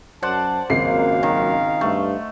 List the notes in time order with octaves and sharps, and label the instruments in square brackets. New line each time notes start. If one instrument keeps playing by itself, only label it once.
[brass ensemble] F#2 A5 [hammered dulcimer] C5 D5 F#5
[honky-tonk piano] G#1 C#2 C7 [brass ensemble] F#2 A#3 [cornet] F5
[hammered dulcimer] D#3
[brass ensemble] G2 [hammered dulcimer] A3